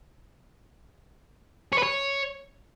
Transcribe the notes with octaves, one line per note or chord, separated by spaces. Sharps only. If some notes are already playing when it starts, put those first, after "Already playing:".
C#5
B4
C#5